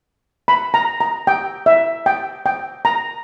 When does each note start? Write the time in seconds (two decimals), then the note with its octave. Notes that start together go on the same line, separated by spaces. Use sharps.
0.48 B5
0.74 A#5
1.00 A#5
1.27 G5
1.66 E5
2.06 G5
2.46 G5
2.85 A#5